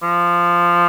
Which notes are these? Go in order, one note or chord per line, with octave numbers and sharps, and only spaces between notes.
F3